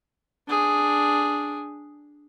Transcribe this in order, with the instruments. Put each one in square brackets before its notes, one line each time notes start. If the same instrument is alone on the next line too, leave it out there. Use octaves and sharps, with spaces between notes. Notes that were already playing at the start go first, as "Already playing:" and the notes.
[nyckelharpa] D4 G#4